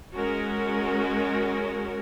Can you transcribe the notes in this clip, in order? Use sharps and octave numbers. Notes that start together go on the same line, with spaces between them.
G#3 C#4 F#4 A#4